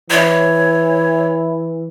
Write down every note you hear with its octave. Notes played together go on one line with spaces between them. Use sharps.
E3 C#5 E5 B5